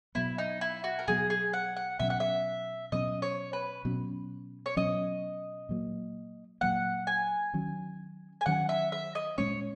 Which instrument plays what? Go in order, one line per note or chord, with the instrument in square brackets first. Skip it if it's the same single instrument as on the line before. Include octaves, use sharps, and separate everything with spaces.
[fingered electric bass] B2 F#3 B3 [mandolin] E4
[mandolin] D#4
E4
F#4
A#4
[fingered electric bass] B2 F#3 B3 [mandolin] G#4
[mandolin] G#4
F#5
F#5
[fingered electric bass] B2 F#3 C#4 [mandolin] E5
[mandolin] F#5
E5
[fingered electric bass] B2 F#3 C#4 [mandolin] D#5
[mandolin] C#5
B4
[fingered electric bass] B2 F#3 C#4
[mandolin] C#5
[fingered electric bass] B2 F#3 C#4 [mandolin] D#5
[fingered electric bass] A#2 F#3 A#3
[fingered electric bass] A#2 F#3 A#3 [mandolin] F#5
[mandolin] G#5
[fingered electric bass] D#3 F#3 C#4
[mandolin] G#5
[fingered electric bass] D#3 F#3 C#4 [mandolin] F#5
[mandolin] E5
E5
D#5
[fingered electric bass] A#2 G#3 C#4 [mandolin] C#5